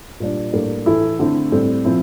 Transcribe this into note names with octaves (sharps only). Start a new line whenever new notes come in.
A#2 G3 D4
A2 G3 A#3 D4
A2 E3 A3 E4
D3 A3 C4 E4
A2 G3 C4
A#2 F3 C4 E4